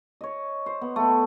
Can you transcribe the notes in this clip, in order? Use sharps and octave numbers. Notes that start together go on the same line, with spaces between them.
C#5 D#5
C5
B3
A3 B3